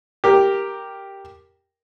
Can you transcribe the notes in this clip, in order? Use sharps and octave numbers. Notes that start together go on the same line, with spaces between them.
G4 A#4